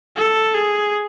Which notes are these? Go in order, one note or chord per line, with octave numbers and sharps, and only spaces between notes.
A4
G#4